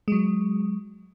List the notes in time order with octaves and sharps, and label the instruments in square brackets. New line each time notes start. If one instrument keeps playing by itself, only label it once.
[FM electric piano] F#3 G#3